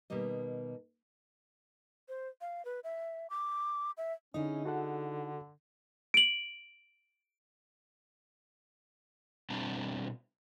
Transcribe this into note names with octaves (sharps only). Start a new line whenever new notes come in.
B2 D#3 G3 A#3 D#5
C5
F5
B4
E5
D6
E5
D3 C#4 D#4 E4 G#4 D#5
D3 F#4 A4 F#5
D7 F#7
B2 G3 C4 D4 A5 A#5